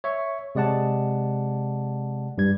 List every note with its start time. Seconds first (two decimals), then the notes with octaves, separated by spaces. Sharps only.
0.04 C#5 E5 C#6
0.55 C3 G#3 D5 F#5 A5
2.38 G2 G3 G#6